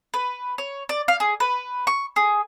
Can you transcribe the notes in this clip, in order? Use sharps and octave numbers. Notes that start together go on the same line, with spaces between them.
B4
C#5
D5
F5
G#4
B4
C#6
G#4